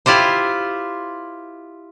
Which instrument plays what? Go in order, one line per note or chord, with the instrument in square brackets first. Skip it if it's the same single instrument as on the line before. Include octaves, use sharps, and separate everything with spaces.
[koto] E4 F4 G4 C5